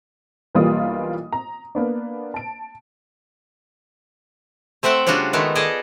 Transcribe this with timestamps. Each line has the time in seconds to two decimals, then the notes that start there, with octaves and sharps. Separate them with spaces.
0.55 B1 E3 G3 A#3 F4 D#6
1.32 A#5
1.75 A#3 B3 D4
2.34 A5 D7
4.83 A3 C4 E5 F#5 G5
5.07 C#3 G3 D4 F4 F#4
5.33 D#3 G#3 A3 B3
5.55 G#4 A4 D5 D#5